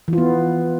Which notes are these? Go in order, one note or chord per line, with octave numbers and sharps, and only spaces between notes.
E3 B3 F4